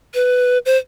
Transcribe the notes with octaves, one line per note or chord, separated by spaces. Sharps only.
B4
C5